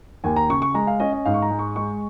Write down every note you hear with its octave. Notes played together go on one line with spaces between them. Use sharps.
D#2 G#5
A#5
C#3 C#6
C#6
G#3 A#5
F5
C#4 D#5
D#5
G#2 F5
C#6
A#5
G#3
C#6
G#3 C#6